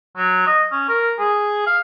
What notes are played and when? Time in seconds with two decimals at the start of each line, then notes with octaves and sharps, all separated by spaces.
0.17 F#3
0.47 D#5
0.72 C#4
0.89 A#4
1.19 G#4
1.66 F5